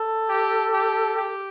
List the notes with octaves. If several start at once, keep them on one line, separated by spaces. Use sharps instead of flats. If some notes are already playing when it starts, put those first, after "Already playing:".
Already playing: A4
G4
G4
G4